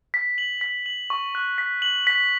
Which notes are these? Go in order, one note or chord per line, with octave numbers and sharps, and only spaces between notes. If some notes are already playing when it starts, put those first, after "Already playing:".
B6
F#7
B6
F#7
C#6
F#6
B6
F#7
B6